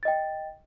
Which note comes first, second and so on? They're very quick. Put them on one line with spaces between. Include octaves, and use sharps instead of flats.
A6 D#5 G5